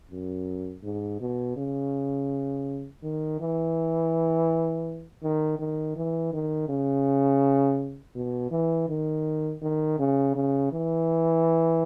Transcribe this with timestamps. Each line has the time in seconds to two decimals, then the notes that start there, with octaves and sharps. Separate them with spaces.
0.11 F#2
0.84 G#2
1.20 B2
1.57 C#3
3.03 D#3
3.41 E3
5.23 D#3
5.59 D#3
5.96 E3
6.33 D#3
6.69 C#3
8.16 B2
8.52 E3
8.89 D#3
9.62 D#3
9.99 C#3
10.35 C#3
10.72 E3